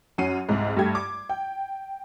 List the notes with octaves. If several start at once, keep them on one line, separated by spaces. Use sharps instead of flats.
F#2 C#4 F#5 C7 D#7
C2 G#2 G#3
G2 A3 G4 G#6
D6
G5